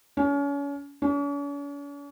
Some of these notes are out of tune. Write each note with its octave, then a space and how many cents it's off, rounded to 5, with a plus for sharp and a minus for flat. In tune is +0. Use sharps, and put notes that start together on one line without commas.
C#4 +35
C#4 +45